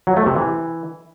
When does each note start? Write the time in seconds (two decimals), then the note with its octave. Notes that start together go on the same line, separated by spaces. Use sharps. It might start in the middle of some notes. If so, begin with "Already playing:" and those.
0.07 F#3
0.17 A3
0.26 C3
0.36 E3